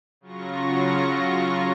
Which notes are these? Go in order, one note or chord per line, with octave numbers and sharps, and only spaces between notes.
C#3 F#3 F4 C#6 A#6